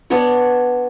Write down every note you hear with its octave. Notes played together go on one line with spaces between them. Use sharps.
B3 D4 C#5 C#6